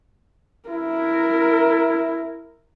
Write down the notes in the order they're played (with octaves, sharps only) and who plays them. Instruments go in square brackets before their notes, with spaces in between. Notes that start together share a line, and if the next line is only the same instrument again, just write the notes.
[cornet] E4 [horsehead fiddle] A#4